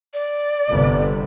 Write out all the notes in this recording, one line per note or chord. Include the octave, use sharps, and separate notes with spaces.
D5
G1 C3 B3